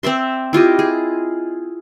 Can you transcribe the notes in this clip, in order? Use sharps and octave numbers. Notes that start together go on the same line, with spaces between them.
C4 D5 E5 C6
E4 F4 G4 D#5
G#4